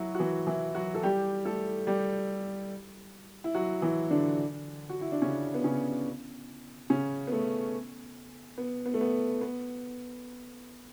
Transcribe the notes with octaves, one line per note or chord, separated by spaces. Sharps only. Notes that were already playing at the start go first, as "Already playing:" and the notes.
Already playing: F#3 E4 F#4
F#4
E3 E4
E3 E4
F#3 F#4
A4
G3 G4
A3 A4
G3 G4
E4
F#3 F#4
E3 E4
D3 D4
F#4
E4
D4
C#3 C#4
B3
C#3 C#4
C#3 C#4
B3
A3
B3
B3
A3
B3
B3